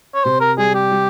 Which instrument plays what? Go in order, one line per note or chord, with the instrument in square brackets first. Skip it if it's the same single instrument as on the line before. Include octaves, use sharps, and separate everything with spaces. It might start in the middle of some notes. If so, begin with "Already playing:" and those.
[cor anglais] C#5
[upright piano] C3 [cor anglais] C5
[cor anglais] A#4
[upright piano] G3 [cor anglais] G#4
[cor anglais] G4
[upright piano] G3